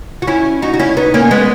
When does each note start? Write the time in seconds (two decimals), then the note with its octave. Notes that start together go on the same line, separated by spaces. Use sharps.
0.22 F#4
0.27 C#4 E4
0.62 D#4 F#4
0.74 F#4
0.79 C#4 E4
0.97 B3 D#4
1.14 A#3 C#4
1.31 G#3 B3